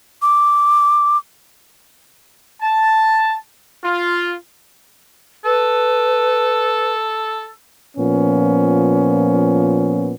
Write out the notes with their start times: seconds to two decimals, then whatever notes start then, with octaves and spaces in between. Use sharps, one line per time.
0.22 D6
2.62 A5
3.84 F4
5.45 A4 B4
7.97 A#2 F3 B3 C#4